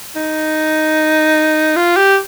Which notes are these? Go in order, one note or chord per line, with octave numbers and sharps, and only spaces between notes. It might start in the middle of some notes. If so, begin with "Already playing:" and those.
D#4
F4
G4